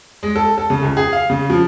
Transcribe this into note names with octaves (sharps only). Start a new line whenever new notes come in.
G#3
A4
A4
C#3
C#2
G#4
F5
C#3
F3